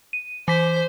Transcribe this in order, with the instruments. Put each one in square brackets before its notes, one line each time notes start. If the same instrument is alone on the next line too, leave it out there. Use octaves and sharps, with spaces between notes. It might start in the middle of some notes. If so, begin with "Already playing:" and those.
[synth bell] D#7
[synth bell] E3 B6 [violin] C5